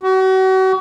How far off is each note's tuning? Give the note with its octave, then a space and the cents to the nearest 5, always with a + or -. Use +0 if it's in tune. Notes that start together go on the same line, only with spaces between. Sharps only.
F#4 +35